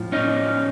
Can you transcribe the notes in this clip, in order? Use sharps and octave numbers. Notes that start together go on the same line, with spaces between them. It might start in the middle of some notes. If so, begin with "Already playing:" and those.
Already playing: A2 F3
C#4 D#4